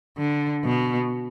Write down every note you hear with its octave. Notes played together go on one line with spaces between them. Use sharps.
D3
B2